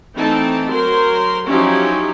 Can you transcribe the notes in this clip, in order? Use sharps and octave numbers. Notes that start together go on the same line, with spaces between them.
E3 A3 C4 D#4 G5 A5
F#3 A#4 C5 C6
F3 F#3 C#4 D#4 E4 G4